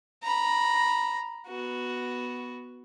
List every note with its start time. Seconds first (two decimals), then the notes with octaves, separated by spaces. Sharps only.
0.23 A#5 B5
1.47 B3 F#4